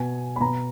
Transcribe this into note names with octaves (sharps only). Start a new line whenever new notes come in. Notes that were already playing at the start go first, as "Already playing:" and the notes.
Already playing: B2 G#5
B5
B2 A#5